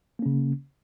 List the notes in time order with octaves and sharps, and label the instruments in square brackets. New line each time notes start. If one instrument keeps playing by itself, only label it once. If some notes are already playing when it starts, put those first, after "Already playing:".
[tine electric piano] A#3
C#4
C#3